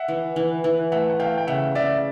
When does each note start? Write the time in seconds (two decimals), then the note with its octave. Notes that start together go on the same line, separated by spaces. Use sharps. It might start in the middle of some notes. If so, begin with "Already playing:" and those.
Already playing: E5 F#5
0.08 E3
0.36 E3
0.64 E3
0.92 A3 E5 F#5
1.10 F#5
1.20 A3 F5 G5
1.38 G5
1.47 C#3 E5 F#5
1.75 C#3 D5 E5